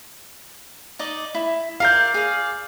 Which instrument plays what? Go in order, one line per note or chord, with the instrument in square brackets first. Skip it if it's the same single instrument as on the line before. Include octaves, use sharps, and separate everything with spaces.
[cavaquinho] D#4 D5 D#5
E4
[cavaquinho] F4 A#4 D5 [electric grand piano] F5 G6
[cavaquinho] G#4 D5